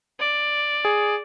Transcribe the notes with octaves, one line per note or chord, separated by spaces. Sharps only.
D5
G#4